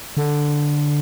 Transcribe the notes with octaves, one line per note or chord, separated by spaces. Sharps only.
D3